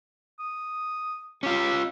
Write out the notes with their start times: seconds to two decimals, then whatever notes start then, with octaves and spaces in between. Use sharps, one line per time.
0.39 D#6
1.43 C#4 F4 G4